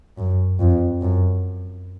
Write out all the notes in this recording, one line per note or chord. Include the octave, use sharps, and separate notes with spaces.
F#2
F2
F#2